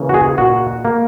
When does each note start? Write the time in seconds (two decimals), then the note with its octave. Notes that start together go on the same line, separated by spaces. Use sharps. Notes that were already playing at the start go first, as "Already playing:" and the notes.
Already playing: C#3 E3 A#3
0.09 F#4
0.14 G#4
0.38 A#2 F#4
0.85 A#3